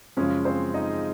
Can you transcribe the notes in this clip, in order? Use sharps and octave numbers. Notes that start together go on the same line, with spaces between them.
F#2 C#3 F3 G#3 C#4 G#4
C4 C5
D#4 D#5